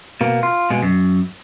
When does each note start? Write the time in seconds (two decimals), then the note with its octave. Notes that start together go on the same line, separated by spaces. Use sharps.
0.21 B2 A#3
0.43 F4
0.70 B2 G#3
0.83 F#2